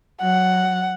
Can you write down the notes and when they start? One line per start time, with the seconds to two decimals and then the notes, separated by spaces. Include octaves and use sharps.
0.21 F#3 F#5